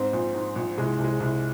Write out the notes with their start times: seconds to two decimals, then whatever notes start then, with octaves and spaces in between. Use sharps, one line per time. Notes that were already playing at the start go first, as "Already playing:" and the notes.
Already playing: G#2 C4
0.13 A#1
0.35 G#2
0.56 A#1
0.77 C2 G#3
0.99 C2
1.04 G#3
1.20 C2